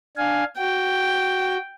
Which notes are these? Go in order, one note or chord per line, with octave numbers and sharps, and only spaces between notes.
D4 F5 G#5
F#4 G5